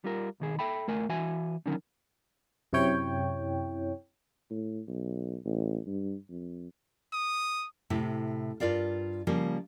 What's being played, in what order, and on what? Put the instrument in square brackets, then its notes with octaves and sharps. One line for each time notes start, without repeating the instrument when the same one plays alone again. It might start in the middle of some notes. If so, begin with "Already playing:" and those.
[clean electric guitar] G3 F4 A#4
B1 D#3 G#4
A4 E5 G5 B5
F2 A3 A#4 G#5
E3 F#4 E5 G#5
D3 D#3 F#3 C#4 D#4 A#4
[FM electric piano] F#2 C3 E4 C#5 G5
[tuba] A2
B1
A1
G2
F2
[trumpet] D#6
[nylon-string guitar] A2 C3 E4
G2 F4 A#4 D5 F5
C#3 F3 G3 A#3